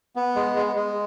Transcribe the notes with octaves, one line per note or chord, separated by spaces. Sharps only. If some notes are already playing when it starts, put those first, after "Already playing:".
B3
G#3
G#3
G#3